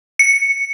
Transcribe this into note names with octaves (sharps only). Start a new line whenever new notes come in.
C#7